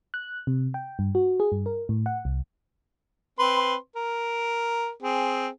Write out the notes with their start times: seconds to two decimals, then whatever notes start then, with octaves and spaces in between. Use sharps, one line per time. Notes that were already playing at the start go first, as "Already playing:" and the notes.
0.14 F#6
0.47 C3
0.74 G5
0.99 G2
1.15 F#4
1.40 G#4
1.52 G2
1.66 A#4
1.89 A2
2.06 F#5
2.25 C2
3.39 C4 B4 C6
3.96 A#4
5.03 C4 G#4